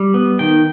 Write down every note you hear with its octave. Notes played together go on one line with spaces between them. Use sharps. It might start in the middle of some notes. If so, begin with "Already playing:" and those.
Already playing: G3
B3
D#3 G5